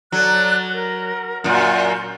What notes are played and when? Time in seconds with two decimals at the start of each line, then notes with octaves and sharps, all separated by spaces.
0.12 F#3 A4 D5 F#6
0.71 A#4
1.44 F#2 A#2 F4 F#4 G6